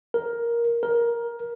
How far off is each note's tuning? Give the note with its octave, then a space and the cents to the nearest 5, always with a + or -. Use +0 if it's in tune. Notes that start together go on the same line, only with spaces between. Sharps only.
A#4 +10
A#4 +15